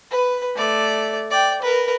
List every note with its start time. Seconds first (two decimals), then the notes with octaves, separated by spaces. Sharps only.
0.11 B4
0.56 A3 D5
1.31 D5 G5
1.62 A#4 B4